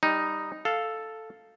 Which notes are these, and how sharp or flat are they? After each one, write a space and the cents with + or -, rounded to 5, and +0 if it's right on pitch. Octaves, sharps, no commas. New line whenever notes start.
G3 +15 D#4 +0
A4 +0 F5 +0